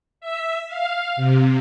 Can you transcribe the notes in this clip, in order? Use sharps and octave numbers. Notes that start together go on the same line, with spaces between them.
E5
F5
C3